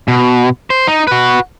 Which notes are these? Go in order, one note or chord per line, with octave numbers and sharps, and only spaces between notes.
B2
C5
D#4
F#4 B4